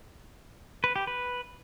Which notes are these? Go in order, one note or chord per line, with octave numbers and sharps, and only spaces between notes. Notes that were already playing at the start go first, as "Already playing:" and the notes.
B4
G4
B4